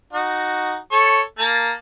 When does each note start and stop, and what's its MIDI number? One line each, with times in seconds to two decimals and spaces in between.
0.13 0.76 63
0.13 0.76 66
0.92 1.21 69
0.92 1.21 73
0.92 1.21 85
1.39 1.73 58
1.39 1.73 81
1.39 1.73 82